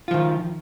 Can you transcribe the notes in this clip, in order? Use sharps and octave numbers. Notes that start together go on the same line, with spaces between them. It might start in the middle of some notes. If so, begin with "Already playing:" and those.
D#3 F3 F4